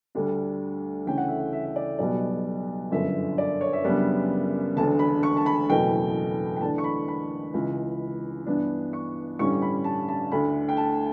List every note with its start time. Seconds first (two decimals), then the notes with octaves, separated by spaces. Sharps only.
0.15 D2 D3 G3 D4
1.06 D2 C#3 E3 A3 C#4 G5
1.18 F#5
1.28 E5
1.40 F#5
1.53 E5
1.65 E5
1.76 D5
1.99 B1 B2 G3 B3 D5
2.91 G1 F#2 D3 E5
3.38 D5
3.61 C#5
3.73 E5
3.84 F#2 C#3 G3 B3 D4
4.76 E1 D2 D3 A5
4.99 B5
5.23 C#6
5.37 A5
5.46 B5
5.69 F#1 E2 B2 A3 G5
6.57 G5
6.61 E2 D3 A3 D4 A5
6.78 C#6
6.84 B5
7.08 B5
7.54 C#2 C#3 E3
8.46 G2 E3 B3 D4
8.93 C#6
9.39 A1 G2 D3 G3 C#4 C#6
9.62 B5
9.84 A5
10.08 A5
10.32 D2 D3 A3 B5
10.69 G5
10.77 A5